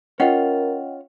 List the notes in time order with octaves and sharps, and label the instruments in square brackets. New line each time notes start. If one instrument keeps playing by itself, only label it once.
[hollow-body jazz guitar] C#4 F4 [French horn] A#4 [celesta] D#5 F#5 G5